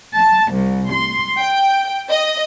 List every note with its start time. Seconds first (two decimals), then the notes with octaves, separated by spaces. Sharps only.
0.15 A5
0.51 C2
0.91 C6
1.40 G5
2.09 D#5